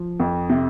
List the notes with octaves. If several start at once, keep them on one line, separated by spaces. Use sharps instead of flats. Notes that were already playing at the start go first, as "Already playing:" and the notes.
Already playing: F3
F2
C3